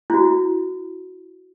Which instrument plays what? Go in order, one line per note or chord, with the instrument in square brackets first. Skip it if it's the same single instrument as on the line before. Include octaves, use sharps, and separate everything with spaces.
[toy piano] E4 F#4